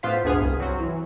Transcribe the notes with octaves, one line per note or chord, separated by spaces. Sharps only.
A2 B3 F4 C5 F5 B6
G1 D2 B3 G#4 F6
C2
F#3 C4 F#4
E3